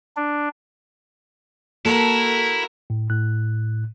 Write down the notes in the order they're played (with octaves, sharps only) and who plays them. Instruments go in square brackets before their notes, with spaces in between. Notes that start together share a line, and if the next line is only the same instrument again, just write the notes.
[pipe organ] D4
[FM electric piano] A#3 [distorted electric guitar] E4 [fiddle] F#4 A#4 [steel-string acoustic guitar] A4
[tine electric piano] A2
A2 F#6